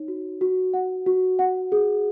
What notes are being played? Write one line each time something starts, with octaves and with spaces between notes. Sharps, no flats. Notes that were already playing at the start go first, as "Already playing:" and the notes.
Already playing: D#4 C#5
F#4
F#4
F#5
F#4
F#5
G#4